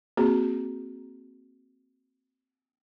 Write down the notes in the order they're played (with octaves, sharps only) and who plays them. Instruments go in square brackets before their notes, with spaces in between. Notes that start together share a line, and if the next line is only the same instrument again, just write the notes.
[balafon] A#3 C4 F#4 G#4